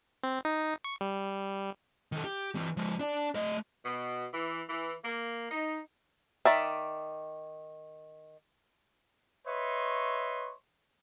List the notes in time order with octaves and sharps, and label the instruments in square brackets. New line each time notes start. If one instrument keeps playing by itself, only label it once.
[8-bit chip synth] C4
D#4
C#6
G3
[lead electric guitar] D#3 A4
G4
E3 C4
F3 G#3
D4 D5
A3 D#5
[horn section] B2
E3
E3
A#3
D#4
[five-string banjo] D#3 D5 E5
[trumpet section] B4 C#5 D#5 E5 C6 C#6